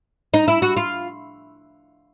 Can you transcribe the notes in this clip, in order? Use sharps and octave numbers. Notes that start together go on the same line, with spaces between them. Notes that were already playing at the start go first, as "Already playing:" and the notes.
D#4
E4
F#4
F4